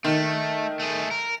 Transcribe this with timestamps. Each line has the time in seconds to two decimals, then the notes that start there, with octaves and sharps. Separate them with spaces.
0.04 D#3 A3
0.79 A3 G#4
1.11 A#4